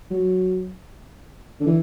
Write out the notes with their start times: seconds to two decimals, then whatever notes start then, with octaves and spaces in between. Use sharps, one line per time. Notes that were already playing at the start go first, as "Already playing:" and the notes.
0.10 F#3
1.60 D3
1.66 E3